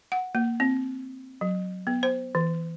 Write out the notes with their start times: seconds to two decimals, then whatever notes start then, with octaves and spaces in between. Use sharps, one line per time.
0.12 F#5
0.35 A#3
0.60 C4
1.41 F#3
1.87 B3
2.03 C5
2.35 E3